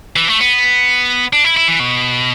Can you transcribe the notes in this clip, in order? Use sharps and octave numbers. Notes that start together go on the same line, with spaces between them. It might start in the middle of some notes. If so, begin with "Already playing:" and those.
E3
A3
B3
D4
E4
E4
E3
B2